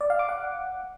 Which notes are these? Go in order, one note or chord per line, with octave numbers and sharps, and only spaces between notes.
D5
F5
D6
F#5